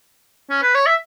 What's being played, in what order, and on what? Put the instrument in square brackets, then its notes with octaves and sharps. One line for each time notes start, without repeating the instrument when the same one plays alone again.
[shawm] C#4
B4
C#5
E5